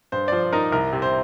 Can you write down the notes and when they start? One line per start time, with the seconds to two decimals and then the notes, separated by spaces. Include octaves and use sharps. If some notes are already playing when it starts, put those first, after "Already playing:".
0.12 G2 C5
0.28 D5
0.32 F3 C5
0.52 D#4 A#4
0.72 C2 A#4
0.92 C3
1.02 C5